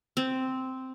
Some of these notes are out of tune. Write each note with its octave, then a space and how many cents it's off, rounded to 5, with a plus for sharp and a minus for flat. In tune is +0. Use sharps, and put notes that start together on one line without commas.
C4 -5